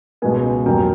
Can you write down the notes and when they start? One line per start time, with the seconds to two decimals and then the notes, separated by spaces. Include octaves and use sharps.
0.22 C#2 B2 G#3 B3 G#5
0.66 F2 D3 F#3 A#3 G5